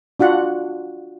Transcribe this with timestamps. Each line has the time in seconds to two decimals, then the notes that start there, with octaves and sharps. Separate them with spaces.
0.20 D4 F4 F#4 F#5